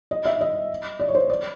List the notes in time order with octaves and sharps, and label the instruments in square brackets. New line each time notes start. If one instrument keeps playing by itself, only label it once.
[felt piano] D#5
E5
D#5
D5
C#5
C5
D5